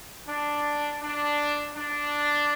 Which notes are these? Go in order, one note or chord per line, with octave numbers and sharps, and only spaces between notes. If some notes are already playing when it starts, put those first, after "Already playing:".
D4
D4
D4